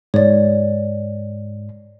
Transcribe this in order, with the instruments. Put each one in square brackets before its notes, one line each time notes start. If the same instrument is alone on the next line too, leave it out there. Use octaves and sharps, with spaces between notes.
[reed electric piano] G#2 [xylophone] C#5 D5